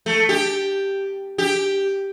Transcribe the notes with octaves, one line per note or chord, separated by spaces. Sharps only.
A3
G4
G4